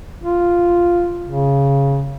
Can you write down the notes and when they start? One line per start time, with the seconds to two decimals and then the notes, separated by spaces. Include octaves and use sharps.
0.22 F4
1.26 C#3